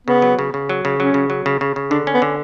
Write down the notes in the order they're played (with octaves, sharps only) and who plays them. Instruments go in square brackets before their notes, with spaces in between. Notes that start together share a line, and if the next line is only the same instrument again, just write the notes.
[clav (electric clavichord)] C#3 [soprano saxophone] B3
[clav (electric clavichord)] F#3
C#3
C#3
F#3
C#3
[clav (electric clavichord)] F#3 [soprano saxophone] C#4
[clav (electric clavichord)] C#3
F#3
C#3
C#3
C#3
[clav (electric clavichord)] D3 [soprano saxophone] D4
[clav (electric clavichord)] C#4
[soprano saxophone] B3
[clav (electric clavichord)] D3